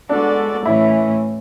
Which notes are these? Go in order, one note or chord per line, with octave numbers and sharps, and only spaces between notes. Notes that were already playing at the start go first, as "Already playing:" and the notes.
G#3 B3 D4 F#4 A4 D5
A2 E3 A3 C#4 E4